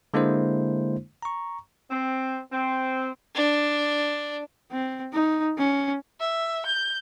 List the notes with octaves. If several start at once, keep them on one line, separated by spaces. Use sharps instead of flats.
D3 G#3 A#3 D4 E4 C5
A#5 C#6
C4
C4
D4
C4
D#4
C#4
E5
G6